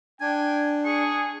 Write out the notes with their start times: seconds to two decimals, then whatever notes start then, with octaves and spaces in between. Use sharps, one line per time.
0.21 D4 G5 G#5
0.85 G#4 C#6